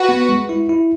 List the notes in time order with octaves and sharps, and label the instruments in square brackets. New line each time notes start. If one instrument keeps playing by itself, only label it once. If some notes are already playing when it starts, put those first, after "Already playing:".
Already playing: [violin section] F#4 B4
[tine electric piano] B3
G#3
E4
E4